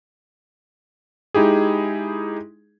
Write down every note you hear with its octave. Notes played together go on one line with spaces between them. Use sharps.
G#3 D#4 E4 G4 G#4